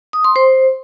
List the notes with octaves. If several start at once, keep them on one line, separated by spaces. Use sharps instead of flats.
D#6
C6
C5